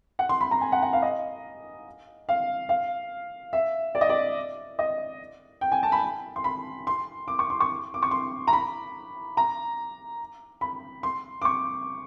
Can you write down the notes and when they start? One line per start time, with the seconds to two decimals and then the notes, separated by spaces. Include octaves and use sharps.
0.19 F#5
0.29 C6
0.41 B5
0.51 A#5
0.61 G#5
0.72 F#5
0.82 F#5
0.93 F5
1.02 D#5
2.29 F5
2.69 F5
3.53 E5
3.95 D5
4.01 D#5
4.09 D5
4.79 D#5
5.61 G5
5.72 G#5
5.83 A5
5.92 B5
6.36 C6
6.44 B5
6.87 C6
7.28 D6
7.39 C#6
7.50 C6
7.60 C#6
7.94 D6
8.02 C#6
8.11 C6
8.47 A#5
8.53 B5
9.37 A#5
10.61 B5
11.03 C6
11.42 D6
11.45 C#6